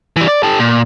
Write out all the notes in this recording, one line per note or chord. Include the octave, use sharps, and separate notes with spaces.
E3 G3
D5
G4 A4
A#2